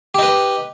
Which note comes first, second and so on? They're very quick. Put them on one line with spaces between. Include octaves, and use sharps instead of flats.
G4 D#4 B4